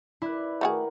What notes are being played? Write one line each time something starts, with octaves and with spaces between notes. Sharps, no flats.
E4 B4 D5
D#3 A3 F#4 G#4 A#4 F#5